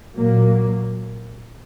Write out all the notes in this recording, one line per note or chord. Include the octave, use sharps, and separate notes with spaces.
A#2 F#3 A#3